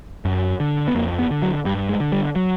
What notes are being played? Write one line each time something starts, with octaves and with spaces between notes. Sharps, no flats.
F#2
D3
B3
F2 A#3
B3
D3
F#3
G2 G3
G#3
D3
G3
F#3